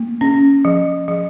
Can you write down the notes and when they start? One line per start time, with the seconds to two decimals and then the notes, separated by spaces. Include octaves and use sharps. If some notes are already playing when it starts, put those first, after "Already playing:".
Already playing: A#3
0.21 C#4
0.65 F3
1.08 F3